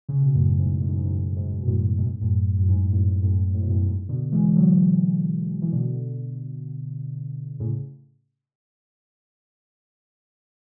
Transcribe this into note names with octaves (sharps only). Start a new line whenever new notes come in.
C#3
B2
F#2 A2
G#2
G#2
F#2
G#2
F#2
G#2
B2
F#2 A2
G#2 B2
F#2 A2
F#2
G#2
F#2 A2
F#2 A2
A2
B2
F#2 A2
G#2
B2 D3
E3 G#3
D3 F#3
E3
B2 D3
A2 C#3